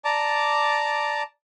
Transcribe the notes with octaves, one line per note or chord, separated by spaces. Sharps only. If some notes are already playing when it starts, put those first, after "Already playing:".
D5 A5 A#5 D6